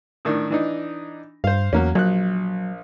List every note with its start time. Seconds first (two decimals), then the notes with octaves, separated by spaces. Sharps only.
0.25 A2 D#3 D4
0.50 E3 D4 D#4
1.44 G2 C5 F5
1.73 E2 F#3 A#3 C#4
1.95 A#1 F#3 F#6